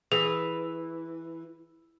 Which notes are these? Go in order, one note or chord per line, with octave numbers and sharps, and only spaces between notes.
E3 G#4